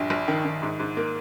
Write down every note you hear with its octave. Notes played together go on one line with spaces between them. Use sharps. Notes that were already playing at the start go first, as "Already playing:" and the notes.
Already playing: A#1 G2
A#1
D#3
D#3
G#2
G#2
A#3